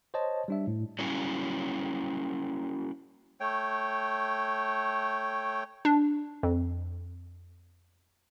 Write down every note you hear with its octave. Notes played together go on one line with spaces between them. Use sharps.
C5 C#5 D#5 A5
G3 D4 E5
A2
F#3 G3 A#3 C#4 E4
A3 C#5 G5
D4
F2